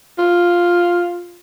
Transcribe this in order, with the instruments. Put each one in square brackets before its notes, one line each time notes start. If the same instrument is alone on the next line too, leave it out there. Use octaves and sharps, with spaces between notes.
[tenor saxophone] F4